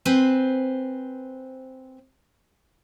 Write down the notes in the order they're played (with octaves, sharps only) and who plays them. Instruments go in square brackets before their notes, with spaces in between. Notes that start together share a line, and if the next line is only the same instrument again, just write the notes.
[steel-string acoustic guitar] C4 B4 C5 G#5